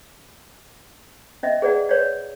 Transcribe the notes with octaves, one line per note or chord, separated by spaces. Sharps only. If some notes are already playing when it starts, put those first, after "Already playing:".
C#4 D#5 E5
G#4 B4 D5 F#5
B4 C#5 D5